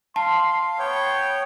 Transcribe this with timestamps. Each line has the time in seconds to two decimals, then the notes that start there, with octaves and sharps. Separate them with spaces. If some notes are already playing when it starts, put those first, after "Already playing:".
0.16 F5 A5 C6
0.79 B3 C#5 G5